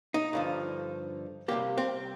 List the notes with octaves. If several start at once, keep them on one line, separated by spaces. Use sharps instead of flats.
D#4
G2 D3 F3
C2 C3 G3 A#3 G4
C4